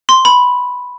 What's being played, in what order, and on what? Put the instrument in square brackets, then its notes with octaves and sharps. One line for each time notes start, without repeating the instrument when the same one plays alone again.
[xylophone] C6
B5